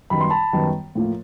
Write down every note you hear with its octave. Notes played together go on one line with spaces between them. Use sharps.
F#2 D#3 G3 B3 B5
C6
A5 B5
F#2 D#3 G3 B3
A2 F3 A#3